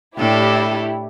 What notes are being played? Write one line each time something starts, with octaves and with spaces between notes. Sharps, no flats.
A2 D4 E4 G4 A4